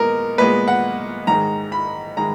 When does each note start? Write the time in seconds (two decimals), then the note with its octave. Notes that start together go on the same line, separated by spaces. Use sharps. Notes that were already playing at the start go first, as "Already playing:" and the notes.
Already playing: A#2 G#3 B3 A#4
0.38 A#2 G#3 B3 B4
0.68 F#5
1.27 G#2 D#3 G#3 A#5
1.72 B5
2.17 D#3 G#3 A#5